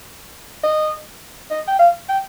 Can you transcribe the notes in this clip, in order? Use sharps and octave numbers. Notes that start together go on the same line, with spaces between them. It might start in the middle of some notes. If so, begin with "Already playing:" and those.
D#5
D#5
G5
F5
G5